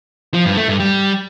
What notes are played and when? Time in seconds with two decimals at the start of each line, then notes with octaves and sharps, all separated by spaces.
0.34 F3
0.45 G2
0.57 A3
0.68 G2
0.80 G3